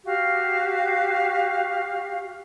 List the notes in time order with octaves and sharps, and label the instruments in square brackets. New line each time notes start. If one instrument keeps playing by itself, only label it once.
[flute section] F#4 G4 F5